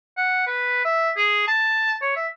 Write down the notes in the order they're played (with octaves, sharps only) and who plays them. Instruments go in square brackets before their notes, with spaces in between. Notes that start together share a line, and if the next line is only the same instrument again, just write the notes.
[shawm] F#5
B4
E5
G#4
A5
C#5
E5